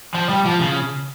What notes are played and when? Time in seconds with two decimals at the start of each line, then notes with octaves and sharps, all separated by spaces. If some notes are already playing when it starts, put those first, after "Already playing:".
0.14 F3
0.29 G3
0.45 F3
0.61 C#3